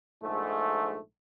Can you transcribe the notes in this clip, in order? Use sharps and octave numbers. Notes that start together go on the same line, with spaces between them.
A#1 G#2 A3